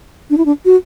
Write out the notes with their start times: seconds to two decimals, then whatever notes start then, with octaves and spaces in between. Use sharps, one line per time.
0.30 D4
0.38 E4
0.46 D4
0.65 F#4